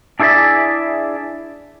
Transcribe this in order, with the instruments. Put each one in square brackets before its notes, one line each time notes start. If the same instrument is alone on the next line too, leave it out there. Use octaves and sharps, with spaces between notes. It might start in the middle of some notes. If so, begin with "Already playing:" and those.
[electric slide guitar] D4 E4 G#4 C#5 D5 E5